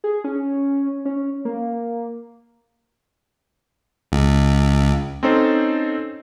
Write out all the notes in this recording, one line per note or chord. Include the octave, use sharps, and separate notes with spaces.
G#4
C#4
C#4
A#3
C#2
C4 C#4 D#4 A4 C5